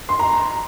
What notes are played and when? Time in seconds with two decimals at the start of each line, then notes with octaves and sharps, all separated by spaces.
0.09 C6
0.19 A#5